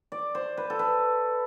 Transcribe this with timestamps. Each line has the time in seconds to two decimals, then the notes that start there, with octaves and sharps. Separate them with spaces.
0.12 D5
0.35 C5
0.57 B4
0.70 A4
0.79 B4